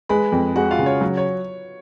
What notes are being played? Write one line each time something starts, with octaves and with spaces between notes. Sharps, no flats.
G#3 B4 B5
F2
G#3 F#4 F#5
F4 F5
C#3
C#5
F#3
C#5